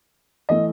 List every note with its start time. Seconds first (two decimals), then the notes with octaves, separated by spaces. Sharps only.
0.49 E3 A3 D#5